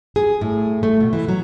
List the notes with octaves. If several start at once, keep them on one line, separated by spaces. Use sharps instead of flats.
G#4
A2
A3
B2
E3
F#3